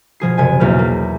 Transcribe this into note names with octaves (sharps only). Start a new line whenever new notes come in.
B2 F3 G#4 C7
F#1 C3 G#5
B1 E2 B2 A#3 F6
A#3